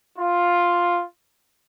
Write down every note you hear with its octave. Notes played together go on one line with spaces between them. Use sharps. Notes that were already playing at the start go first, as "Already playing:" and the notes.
F4